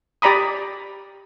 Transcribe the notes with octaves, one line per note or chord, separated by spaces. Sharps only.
G4 D5 A#5 B5 D#6